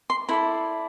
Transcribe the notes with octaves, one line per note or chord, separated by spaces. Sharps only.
C6
E4 A4 D5 B5